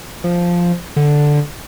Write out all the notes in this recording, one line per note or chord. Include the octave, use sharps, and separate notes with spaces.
F3
D3